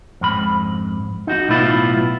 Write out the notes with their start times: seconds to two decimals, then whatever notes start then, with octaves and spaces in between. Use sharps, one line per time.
0.21 F2 G#2 B5
1.27 D#4 F#4
1.49 B1 A2 B3 E4 F4